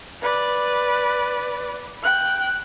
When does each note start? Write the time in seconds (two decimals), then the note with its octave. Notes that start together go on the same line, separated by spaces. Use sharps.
0.22 B4 D5
2.03 G5 F#6